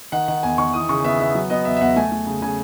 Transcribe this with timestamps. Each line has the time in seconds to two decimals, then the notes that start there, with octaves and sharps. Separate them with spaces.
0.12 D#3 F#5
0.28 D#3 F#5
0.43 E2 G#5
0.58 D#3 C#6
0.73 E3 D#6
0.89 C#3 C#6
1.04 B3 E5
1.20 B3 E5
1.35 F#3
1.50 B3 D#5
1.65 E2 E5
1.77 E5
1.81 E2 F#5
1.96 A3 G#5
2.12 A3
2.26 C#3
2.42 C#3 G#5